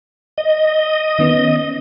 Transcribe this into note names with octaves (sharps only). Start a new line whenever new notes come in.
D#5
D#3 B3 C#4